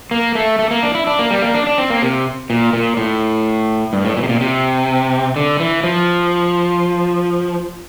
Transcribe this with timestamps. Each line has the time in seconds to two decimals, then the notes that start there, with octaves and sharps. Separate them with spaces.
0.11 A#3
0.35 A3
0.59 A3
0.71 A#3
0.83 D4
0.95 E4
1.07 D4
1.19 A#3
1.31 G3
1.42 A#3
1.55 D4
1.67 D4
1.78 C4
1.90 A#3
2.02 C3
2.50 A#2
2.73 A#2
2.97 A2
3.93 G2
4.05 A2
4.17 A#2
4.23 C3
4.29 A#2
4.41 C3
5.36 D3
5.60 E3
5.83 F3